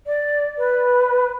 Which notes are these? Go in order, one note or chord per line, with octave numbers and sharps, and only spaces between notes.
D5
B4